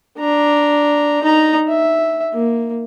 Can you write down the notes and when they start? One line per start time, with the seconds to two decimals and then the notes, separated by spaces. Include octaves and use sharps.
0.18 D4 A#5
1.23 D#4 A#5
1.69 E5
2.33 A#3